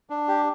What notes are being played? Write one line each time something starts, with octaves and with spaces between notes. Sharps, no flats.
D4
G4